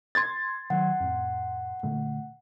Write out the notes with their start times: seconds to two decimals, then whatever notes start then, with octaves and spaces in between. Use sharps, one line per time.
0.15 C6 G#6 A6
0.70 D#3 F#3 F#5
1.00 F2 A2
1.83 A#2 D3 A3